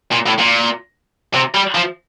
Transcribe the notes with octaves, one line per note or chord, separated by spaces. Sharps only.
A#2
A2
A#2
C3
G3
F3